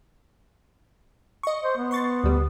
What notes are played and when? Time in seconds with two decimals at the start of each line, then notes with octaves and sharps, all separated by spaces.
1.43 D#5 C#6
1.64 C5
1.77 B3
1.91 C6 C#6 A6
2.23 D2 G3